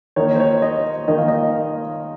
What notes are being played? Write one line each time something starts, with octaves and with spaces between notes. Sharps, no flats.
D#3 A#3 D#4 C#5
C5
C#5
D#5
D#3 A#3 D#4 D#5
F5
D#5